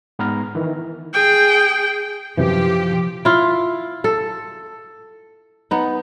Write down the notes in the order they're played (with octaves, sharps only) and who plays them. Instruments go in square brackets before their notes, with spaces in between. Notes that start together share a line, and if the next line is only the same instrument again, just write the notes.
[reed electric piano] G#2 B3 B4 A#5 F6
D#3 E3
[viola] G#4 G5
[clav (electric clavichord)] F#2 C3 E3 [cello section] F3 G4
[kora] E4 F4
A4
B3 D#4